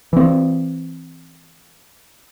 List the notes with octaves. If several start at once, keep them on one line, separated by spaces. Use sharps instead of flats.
E3 C4